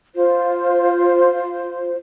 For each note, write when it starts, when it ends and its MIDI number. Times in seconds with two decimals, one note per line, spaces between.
0.16 1.95 65
0.16 1.95 72